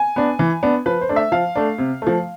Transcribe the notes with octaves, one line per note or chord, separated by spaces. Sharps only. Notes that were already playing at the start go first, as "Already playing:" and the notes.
Already playing: G#5
B3 D4
E3
B3 D4
F3 B4
C5
A3 D4
E5
F3 F5
A3 D4
C3
F3 A3